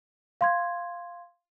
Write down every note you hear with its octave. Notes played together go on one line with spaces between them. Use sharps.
F5 C6 G#6